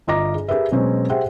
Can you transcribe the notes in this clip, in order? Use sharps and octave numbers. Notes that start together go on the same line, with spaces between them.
G1 F4 D#5 A#5 D6 A#6
G#4
G4 G#4 A#4 B4 E5
B2 F#3 G#3 C4 C#4
G4 G#4 C5 E5 F#5 G5